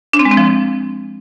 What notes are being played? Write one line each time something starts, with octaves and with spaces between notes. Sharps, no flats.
D4
C4
G#3
C4
F3